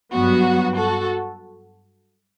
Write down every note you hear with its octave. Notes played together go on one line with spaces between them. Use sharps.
G2 F#3 B3 F#4
F#4 A4